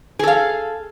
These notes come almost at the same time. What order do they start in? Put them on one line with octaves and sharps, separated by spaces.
G#4 A4 F5